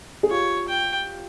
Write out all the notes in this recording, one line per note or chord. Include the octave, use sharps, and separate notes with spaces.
G#4
F4 G4 C#5
G5